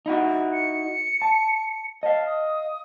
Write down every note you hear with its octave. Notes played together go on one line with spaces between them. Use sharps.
D#4 E4 F#4
C#7
A5
D#5 F5 A5
D#6